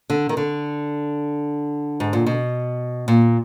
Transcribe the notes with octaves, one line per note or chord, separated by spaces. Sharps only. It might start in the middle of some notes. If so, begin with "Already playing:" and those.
D3
D#3
D3
G#2
A#2
B2
A#2